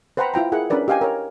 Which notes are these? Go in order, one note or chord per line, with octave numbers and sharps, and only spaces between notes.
B4 C5 F#5 G5 A#5 B5
E4 F4 G5 A#5
E4 G#4 A#4 F#5
C#4 D4 A#4 B4 D5
G4 D#5 F5 G5 G#5
A#4 C#5